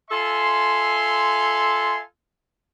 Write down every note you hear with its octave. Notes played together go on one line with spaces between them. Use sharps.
F4 A4 E5 G#5 C6